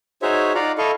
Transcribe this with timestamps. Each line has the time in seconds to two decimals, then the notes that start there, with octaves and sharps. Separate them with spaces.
0.22 D#4 F#4 G#4 C5 C#5 E5
0.55 D#4 F4 D5 F5 F#5 A#5
0.78 E4 A4 D#5 F5 C#6